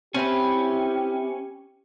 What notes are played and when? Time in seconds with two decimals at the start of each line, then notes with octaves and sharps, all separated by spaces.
0.14 C4 C#4 E4 G4 B4